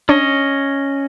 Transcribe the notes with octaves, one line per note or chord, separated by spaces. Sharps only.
C#4 D4 C#5 D#5